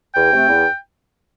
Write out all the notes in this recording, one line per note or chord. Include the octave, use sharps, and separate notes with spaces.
E2 G5
C3 A3 C4
E2